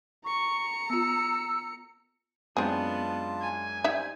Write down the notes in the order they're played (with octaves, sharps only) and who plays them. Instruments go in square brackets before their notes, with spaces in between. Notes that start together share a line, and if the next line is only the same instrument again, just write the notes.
[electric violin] A#5 C#7 [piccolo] C#6
[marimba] B3 F4 [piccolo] E6
[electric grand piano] F#2 G#3 D4 [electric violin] B3 [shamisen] C4 G#4 [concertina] F4 A5
[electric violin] G#5
[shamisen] G3 D#4 E5 [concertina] C5